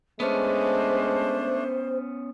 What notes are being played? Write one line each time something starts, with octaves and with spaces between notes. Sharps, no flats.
G#3 A3 B3 C#4 D4 C5